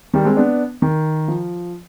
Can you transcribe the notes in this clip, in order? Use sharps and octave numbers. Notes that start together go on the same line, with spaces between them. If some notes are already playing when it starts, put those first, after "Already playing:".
D#3 G3
G#3 C4
B3 D4
D#3
F3